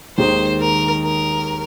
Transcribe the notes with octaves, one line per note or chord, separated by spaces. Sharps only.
D#2 D#3 G#3 D#4 C5
A#4
A#4